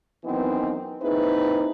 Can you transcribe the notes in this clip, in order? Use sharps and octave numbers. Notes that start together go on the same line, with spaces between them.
F#2 D#3 E3 B3 C4 D#4
A#3 C4 D#4 E4 G#4 B4